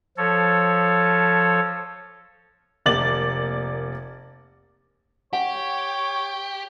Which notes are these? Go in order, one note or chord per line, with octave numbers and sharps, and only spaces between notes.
F3 A4 C#5
F1 A#3 D5 A6 F#7
G4 C#5 F#5